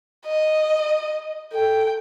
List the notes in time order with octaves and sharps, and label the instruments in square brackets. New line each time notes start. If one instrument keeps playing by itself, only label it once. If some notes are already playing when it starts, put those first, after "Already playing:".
[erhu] D#5
[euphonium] A4 [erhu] G5